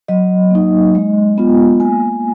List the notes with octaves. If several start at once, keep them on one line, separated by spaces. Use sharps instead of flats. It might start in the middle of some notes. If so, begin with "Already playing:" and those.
F#3 D#5
A#3 D#4
G#3
B3 F4
A#3 G#5